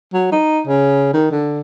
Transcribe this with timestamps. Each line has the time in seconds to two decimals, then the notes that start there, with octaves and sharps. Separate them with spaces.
0.13 F#3
0.32 D#4
0.67 C#3
1.13 D#3
1.31 D3